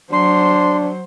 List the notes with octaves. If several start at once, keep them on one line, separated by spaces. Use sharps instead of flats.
F#3 D4 C5 C6